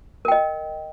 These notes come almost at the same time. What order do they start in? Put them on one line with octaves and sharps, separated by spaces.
A#4 G5 D#5